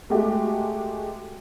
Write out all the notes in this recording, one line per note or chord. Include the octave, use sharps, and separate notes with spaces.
G#3 A3 F#4 G4